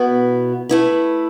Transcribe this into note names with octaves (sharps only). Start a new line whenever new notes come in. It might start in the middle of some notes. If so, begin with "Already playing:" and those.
Already playing: B2 B3 E4
A3 E4 B4